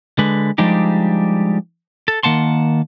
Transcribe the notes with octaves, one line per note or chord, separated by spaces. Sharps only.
D3 G#3 B4
F3 G3 G#3 D4 D#4 G4
A4
D#3 A#3 F#5 A5 C6